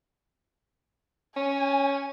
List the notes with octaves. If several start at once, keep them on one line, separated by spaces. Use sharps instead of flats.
C#4 G#5